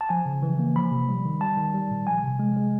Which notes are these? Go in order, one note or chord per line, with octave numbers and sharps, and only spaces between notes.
A5
F3 G#5
C#3
E3
A#3
F3 B5
C3
G3
D#3
G3 A5
D#3
G3
A#2
F3 G#5
C3
G#3
G#3